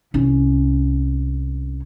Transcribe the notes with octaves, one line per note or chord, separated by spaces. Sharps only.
C2 C#4